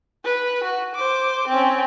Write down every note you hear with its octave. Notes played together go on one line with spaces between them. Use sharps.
B4
F#4
C5 D6
C4 C#4